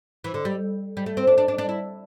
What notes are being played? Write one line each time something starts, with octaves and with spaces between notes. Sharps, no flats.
E3
D3
G3
G3
A3
C4
D4
D4
D4
D4
E4